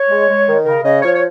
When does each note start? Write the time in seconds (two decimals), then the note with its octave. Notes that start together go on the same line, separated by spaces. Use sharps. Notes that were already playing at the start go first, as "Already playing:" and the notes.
Already playing: C#5
0.10 G#3
0.28 G#3
0.47 D#3
0.65 C#3 A#4
0.84 C#3 D#5
1.02 F3 C#5
1.15 C#5